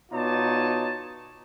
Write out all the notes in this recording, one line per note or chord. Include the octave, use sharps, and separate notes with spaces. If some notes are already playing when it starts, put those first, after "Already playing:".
B2 D#4 F4 C#5 D5 A5